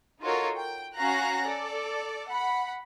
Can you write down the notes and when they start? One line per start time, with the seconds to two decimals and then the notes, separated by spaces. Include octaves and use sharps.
0.22 D#4 F4 F#4 A4 A#4 C#5
0.57 G5
0.95 C#4 F#4 F5 A#5 F#6 A#6
1.46 A4 D5
2.28 F#5 B5